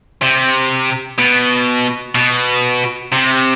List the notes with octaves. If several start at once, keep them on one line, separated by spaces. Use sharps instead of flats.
C3
B2
B2
C3